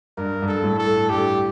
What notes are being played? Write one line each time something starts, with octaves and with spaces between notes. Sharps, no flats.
G2 A#4
G2
A4
A2
A4
G2 G4